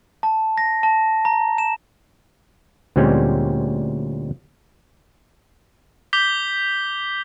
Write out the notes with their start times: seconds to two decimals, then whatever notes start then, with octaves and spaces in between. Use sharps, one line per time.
0.23 A5
0.58 A#6
0.83 A5
1.25 A#5
1.58 E7
2.96 D2 A#2 G3 G#3 C4 C#4
6.13 D6 G6 B6 G7